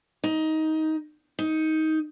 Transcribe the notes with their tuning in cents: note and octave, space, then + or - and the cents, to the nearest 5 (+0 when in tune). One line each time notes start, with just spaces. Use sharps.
D#4 +15
D#4 +15